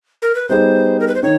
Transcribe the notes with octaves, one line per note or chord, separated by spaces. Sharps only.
A#4
B4
G3 B3 D#4 G#4 C5
A#4
B4
C5
D#3 C#5